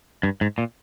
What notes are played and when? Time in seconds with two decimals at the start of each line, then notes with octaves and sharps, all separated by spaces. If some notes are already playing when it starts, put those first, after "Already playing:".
0.23 G2
0.41 G#2
0.58 A#2